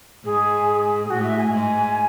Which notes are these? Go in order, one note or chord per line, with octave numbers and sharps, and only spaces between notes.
G#2 G#4
G#4
A2 F#4
E5
G#5
G#2 G#5